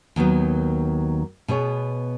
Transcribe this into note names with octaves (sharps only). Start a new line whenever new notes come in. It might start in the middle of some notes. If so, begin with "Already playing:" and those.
D#2 D#3 F#3 B3
B2 B3 G#4 C#5